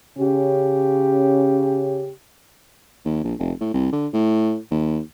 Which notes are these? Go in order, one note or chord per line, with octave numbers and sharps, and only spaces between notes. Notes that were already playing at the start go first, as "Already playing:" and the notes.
C#3 C#4 G4
D#2
A#1
F1
A2
C2
D3
A2
D#2